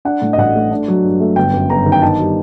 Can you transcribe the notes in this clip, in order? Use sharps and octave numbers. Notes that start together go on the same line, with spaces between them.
D4 F#5
A2
D#5
A1 F#5
A3
D4
F#3
G2
A3
G1 G5
F#2
G1 A#5
D#3
G5
D#4 A5
G3